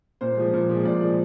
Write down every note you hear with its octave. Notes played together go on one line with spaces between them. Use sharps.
A#2 C5
F3 G#3
A#2
F3 G#3
A#2 D5
F3 G#3